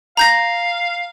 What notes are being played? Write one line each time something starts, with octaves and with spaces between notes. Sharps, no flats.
F5 A#5 G6 A#6